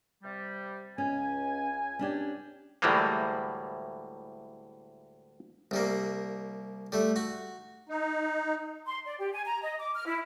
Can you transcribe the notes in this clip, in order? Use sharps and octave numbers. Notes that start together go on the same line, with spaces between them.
C3 G3
C#2 C#4 G#5
C#4 D4 G4
D2 A2 E3 G3 G#3 A#3
C2 G3 A#3
G3 A3
F#4
D#4
C6
D5
G4
G#5
A#5
D#5
D6
F6
E4